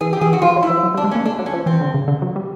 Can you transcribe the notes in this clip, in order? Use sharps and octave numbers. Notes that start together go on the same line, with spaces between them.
E3 G#4
G4
E3 G#4
F#4
F3 F4
F#3
E4
F3
F#3
G3
D4
G#3
C#4
A#3
A3 D4
F#3
C#4
F3
E3 C4
D3
C#3
D3
F#3
G3